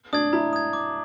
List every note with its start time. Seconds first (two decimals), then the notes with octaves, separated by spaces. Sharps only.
0.13 D4 D#6 G#6
0.33 E4 A#5
0.53 D#6 G#6
0.73 D6